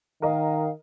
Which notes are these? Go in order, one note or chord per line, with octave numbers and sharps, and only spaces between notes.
D#3 A#4 D#5 F5